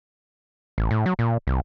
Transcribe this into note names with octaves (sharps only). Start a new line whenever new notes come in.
A1
A2
F#3
A#2
C2